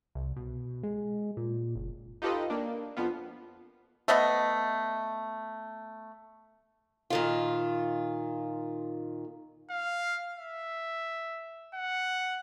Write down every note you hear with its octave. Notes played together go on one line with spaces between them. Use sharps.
C2
B2
G#3
A#2
F#1
D#4 F4 G4 A4 B4 D#5
A#3 D4
F2 F3 B3 F4
A3 B3 D#5 F#5
A#2 D#3 F4
F5
E5
F#5